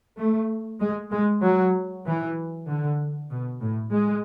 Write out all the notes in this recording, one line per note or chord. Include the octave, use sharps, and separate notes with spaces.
A3
G#3
G#3
F#3
E3
D3
B2
A2
G#3